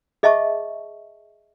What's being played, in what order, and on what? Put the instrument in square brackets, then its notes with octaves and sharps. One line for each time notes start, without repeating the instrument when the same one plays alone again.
[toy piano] G#4 D#5 E5 A5 C#6